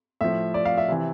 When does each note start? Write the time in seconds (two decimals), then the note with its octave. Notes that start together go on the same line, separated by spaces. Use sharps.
0.21 A2 F3 E5
0.54 D5
0.65 F5
0.78 E5
0.88 C3 E3